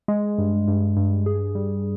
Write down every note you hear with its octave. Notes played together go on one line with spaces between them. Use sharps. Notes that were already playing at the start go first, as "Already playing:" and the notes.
G#3
G2
G2
G2
G#4
G3